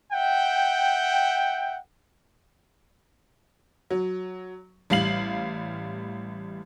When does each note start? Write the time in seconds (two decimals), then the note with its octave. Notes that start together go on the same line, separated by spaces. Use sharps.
0.12 E5 F#5 G5
3.91 F#3
4.90 A1 G3 F5 C7 F#7